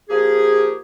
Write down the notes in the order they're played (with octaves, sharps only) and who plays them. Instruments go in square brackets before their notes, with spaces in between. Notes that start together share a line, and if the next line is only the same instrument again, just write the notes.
[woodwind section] F3 A#3 G4 G#4